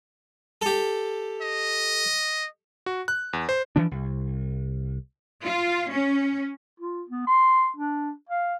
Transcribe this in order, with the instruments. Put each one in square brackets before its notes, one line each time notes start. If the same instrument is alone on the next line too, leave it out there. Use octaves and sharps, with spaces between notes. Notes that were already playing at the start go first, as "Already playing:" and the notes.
[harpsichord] G4 A4
[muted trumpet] D#5
[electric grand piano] F#4
F#6
E2
C5
[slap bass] E3 F3 D4
C2
[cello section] F4
C#4
[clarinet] F4
B3
C6
D4
F5